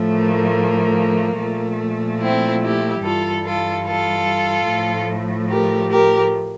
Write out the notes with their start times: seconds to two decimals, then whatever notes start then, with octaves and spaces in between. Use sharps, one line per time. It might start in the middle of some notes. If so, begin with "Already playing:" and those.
Already playing: A2 F3 A3
0.16 A#3
1.39 A#2 F3 A3
2.21 C4 E4
2.62 E4 G4
3.03 G2 E3 G3 F4 A4
3.44 F4 A4
3.85 F4 A4
4.68 A2 F3 A3
5.49 G4 A#4
5.90 G4 A#4